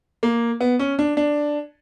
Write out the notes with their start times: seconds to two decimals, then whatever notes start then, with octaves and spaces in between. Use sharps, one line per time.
0.23 A#3
0.60 B3
0.79 C#4
0.99 D4
1.17 D4